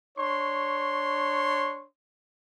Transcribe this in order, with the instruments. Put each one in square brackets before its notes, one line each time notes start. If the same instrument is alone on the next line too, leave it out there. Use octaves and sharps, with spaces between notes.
[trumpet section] D4 C#5 C6 C#6